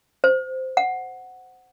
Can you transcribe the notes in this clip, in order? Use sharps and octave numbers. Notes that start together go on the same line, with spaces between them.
C5
F#5